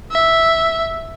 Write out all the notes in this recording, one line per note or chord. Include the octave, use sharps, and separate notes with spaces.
E5